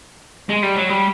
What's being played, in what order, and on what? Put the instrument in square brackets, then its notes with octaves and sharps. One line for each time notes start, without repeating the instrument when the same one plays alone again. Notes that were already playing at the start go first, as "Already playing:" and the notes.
[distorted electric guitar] G#3
G3
F#3
G3